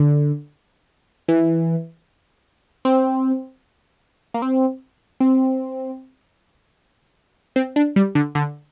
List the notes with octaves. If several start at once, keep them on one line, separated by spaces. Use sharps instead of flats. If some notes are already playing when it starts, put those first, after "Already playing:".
Already playing: D3
E3
C4
A#3
C4
C4
C4
D4
G3
D3
D3